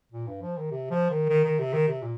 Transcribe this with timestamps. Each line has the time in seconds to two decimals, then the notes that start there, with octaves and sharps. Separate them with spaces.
0.12 A#2
0.27 G2
0.42 F3
0.57 D#3
0.71 C3
0.90 F3
1.10 D#3
1.29 D#3
1.44 D#3
1.59 C3
1.73 D#3
1.88 C3
2.02 A#2